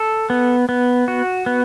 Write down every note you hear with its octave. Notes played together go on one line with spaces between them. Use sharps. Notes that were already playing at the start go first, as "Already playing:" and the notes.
Already playing: A4
B3
B3
F#4
B3